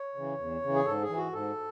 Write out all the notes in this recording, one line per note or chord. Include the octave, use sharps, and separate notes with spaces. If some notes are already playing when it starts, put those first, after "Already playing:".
Already playing: C#5
C#3 E3
E2
C#3 E3
G#4
G#2 A4
G#4
E3
F#4
G#2 A4